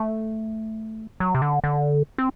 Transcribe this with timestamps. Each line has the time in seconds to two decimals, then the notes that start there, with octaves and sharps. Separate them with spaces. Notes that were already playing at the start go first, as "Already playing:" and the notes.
Already playing: A3
1.20 F#3
1.35 C3
1.42 D3
1.64 D3
2.18 C4